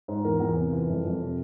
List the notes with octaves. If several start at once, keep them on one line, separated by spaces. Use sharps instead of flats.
G#2
E2 A#4
E2
C3
E3
F2
F2
C3